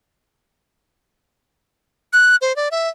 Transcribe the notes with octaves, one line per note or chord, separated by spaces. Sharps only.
F#6
C5
D5
E5